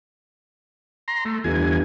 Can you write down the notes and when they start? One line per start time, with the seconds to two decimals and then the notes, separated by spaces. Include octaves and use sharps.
1.08 A#5 C6
1.25 A3
1.44 G1 E2 G#5